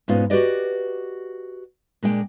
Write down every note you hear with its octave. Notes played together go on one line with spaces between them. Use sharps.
G#2 B2 B3 C#4 F4
F#4 G4 B4 D5 D#5
A#2 G#3 D4 G5